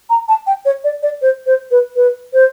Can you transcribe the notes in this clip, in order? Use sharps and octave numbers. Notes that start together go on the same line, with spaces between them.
A#5
A5
G5
C#5
D5
D5
C5
C5
B4
B4
C5